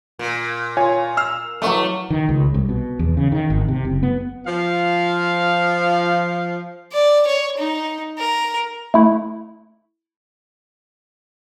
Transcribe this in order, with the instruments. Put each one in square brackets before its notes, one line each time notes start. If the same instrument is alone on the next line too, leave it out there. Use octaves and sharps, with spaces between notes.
[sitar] A#2
[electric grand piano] F4 C#5 G#5
E6 F6 C7
[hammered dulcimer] F#3 C#6 D6 [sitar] A3
[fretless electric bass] D#3
C#2
C2
B2
E2
C#3
D#3
G#1
C3
F#1
B3
[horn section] F3 F5
[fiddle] D5
C#5
D#4
A#4
[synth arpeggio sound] A3 E4